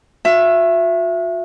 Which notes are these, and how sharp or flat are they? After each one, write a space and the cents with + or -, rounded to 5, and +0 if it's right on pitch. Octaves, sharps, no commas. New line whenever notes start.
F#4 -40 E5 +20